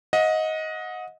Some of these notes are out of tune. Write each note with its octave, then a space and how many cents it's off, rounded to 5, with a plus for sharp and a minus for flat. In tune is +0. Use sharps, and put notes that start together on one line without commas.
D#5 +15 F#5 -30